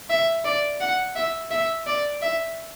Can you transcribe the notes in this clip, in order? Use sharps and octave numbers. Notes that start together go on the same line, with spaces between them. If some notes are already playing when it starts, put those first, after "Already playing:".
E5
D5
F#5
E5
E5
D5
E5